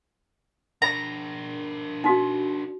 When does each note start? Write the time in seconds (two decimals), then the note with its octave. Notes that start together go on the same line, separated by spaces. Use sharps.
0.82 D4 A#4 A#5
2.04 D#4 F#4